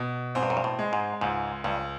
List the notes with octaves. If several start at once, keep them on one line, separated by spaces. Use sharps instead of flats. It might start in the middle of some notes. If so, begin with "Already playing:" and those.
Already playing: B2
G#2 C4
G2
F#2
G2
A2
G#3
G#2
C#2 G#2
C#2 G2